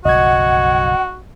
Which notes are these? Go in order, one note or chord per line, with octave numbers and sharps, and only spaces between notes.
F#1 B1 F3 F#4 D#5 F#5 G#6